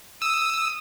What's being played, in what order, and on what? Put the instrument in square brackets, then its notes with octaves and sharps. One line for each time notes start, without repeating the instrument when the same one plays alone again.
[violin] D#6 [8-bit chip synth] E6